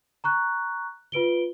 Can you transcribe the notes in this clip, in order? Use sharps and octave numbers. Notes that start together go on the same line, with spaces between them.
A#5 C#6 F#6
F4 B4 D7 G7